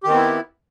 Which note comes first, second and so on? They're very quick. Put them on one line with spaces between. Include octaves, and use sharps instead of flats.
G4 D#3 C4 B3 E4